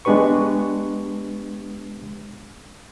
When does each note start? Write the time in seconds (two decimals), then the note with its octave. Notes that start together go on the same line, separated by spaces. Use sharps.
0.05 G#3 B3 D4 G4 B4 C#6